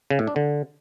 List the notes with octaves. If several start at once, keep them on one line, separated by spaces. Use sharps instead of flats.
C#3
A2
D4
D3